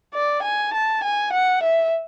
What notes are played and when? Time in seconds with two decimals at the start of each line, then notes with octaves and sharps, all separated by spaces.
0.14 D5
0.43 G#5
0.74 A5
1.03 G#5
1.33 F#5
1.63 E5